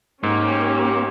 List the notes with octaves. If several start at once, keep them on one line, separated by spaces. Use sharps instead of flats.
G#2 A#3 C#4 G4